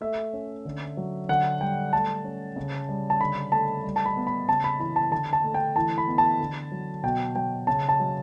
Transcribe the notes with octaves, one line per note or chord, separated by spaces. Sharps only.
A3 E5
C#4
D3
F#3
D3 F#5
G3 G5
A3 A5
C#4
C#3
G3
A5
D3 B5
A3 A5
G3
A5
B5
B3
B5
C#3 A5
B5
E3 B5
A5
D3 A5
A5
A3
G5
E3 A5
B5
B3
A5
D3
F#3
B2 G5
F#3 G5
C#3 A5
A5
F#3